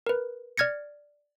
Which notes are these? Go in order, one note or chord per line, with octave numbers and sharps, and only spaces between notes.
A#4 B4
D5 F6 G#6 A#6 C#7